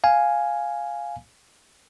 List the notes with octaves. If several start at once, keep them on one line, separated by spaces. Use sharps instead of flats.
F5 G#5